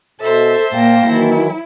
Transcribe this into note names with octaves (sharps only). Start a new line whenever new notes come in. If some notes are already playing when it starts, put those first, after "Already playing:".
B2 A4 C5 E5 A5
A#2 A#3 F5 G5 A#6
D#3 E3 F#3 E4